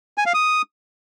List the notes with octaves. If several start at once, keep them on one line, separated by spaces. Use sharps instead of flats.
G#5
F5
D#6